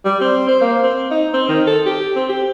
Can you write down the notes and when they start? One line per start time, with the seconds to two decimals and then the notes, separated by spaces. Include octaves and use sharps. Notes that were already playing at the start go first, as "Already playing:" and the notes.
0.05 G3
0.21 C4
0.49 C5
0.61 A#3
0.84 C4
1.11 D#4
1.33 C4
1.48 D#3
1.67 A4
1.86 G4
2.16 C4
2.29 G4